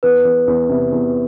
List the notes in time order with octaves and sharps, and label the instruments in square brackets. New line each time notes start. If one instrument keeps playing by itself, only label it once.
[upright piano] E2 [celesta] B4
[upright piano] E2
E2
C3
E2